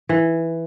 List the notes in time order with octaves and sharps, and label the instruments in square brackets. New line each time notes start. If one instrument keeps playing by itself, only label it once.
[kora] E3